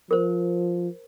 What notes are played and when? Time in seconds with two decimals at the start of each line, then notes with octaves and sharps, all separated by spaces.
0.11 F3 A#4 C5